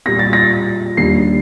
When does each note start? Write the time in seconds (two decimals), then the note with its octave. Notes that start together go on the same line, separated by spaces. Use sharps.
0.05 A#2 G3 A#3 A#6
0.19 A6
0.33 A#6
0.97 D#2 D3 G3 A#3 C7